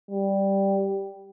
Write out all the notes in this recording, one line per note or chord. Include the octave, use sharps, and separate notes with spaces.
G3